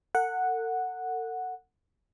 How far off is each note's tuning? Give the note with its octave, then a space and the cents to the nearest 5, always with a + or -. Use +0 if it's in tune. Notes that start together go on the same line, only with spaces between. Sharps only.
A4 +45 F#5 -5